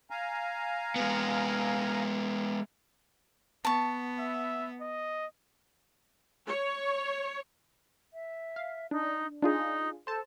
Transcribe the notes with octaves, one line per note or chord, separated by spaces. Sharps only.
F5 G#5 A#5
G#3 B3
B3 A5 C#6
E5
D#5
C#5
E5
F5
D4 D#4
D4 D#4 F4 G#4
A4 C5 A5